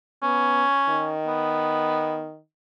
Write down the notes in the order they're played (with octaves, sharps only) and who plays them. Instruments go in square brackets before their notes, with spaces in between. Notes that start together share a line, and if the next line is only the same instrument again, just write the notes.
[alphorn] B3 [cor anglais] C#4
[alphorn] D#3
[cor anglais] B3